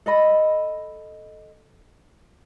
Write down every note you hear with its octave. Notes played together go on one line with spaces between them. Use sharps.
A4 D#5 B5